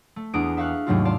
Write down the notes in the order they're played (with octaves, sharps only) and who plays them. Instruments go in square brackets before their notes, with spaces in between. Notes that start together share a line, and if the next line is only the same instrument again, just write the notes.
[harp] A3
E2 B3 D4 G#4 A#5 D7
E5 F5 A#5 C#6 F6 F#6
D#2 G#2 C3 F#3 A3 F4
F4 D5 A5 F6